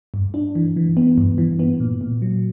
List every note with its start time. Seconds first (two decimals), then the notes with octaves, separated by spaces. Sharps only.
0.14 G2
0.34 D4
0.55 E3
0.76 E3
0.97 B3
1.18 G2
1.38 E3
1.59 B3
1.80 A#2
2.01 A#2
2.22 F#3